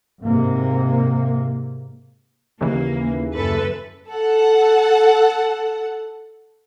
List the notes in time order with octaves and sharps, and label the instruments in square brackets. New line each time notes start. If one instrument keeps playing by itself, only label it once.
[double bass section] G#2 C3 A#3
[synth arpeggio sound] D#2 C#3 E3 [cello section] A#3
[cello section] F#2 A4 B4
[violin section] A4 F#5